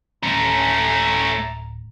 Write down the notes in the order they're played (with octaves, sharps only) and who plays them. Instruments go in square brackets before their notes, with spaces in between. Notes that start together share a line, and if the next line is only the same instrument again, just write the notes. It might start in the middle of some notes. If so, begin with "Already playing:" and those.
[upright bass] D1 [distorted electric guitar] A3 C#4 [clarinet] A#5